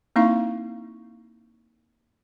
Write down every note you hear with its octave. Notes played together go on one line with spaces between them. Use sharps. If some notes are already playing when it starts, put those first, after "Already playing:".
A#3 C4 D#4 E4 F5 C#6